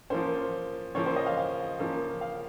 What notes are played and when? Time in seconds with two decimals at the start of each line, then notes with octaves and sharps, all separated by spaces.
0.10 F3 A#3 C#4 C5
0.95 C#3 F3 A#3 C#5
1.06 C5
1.16 D#5
1.26 F5
1.38 F5
1.79 C#3 F3 A#3 C#4
2.21 F5